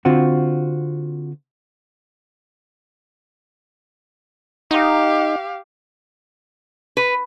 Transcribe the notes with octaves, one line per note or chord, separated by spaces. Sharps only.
D3 C4 F4 F#4
D#4 G4 F5
B4